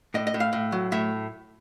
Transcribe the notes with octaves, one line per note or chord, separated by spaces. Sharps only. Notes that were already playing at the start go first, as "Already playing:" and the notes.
A2 D#5
D#5
A2
F5
A2
F#3
A2 E5